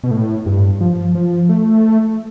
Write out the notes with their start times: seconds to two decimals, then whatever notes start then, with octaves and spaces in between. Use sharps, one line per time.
0.04 B2
0.11 A2
0.46 G2
0.81 F3
1.15 F3
1.49 A3